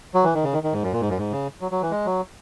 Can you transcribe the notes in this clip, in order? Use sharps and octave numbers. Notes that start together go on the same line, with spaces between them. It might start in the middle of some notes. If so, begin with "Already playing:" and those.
F#3
E3
D#3
C#3
D#3
D#3
G#2
F#2
A#2
G#2
F#2
G#2
C#3
F#3
F#3
E3
G#3
F#3